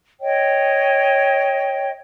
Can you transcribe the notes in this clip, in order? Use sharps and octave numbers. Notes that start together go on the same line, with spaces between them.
C#5 D#5 G5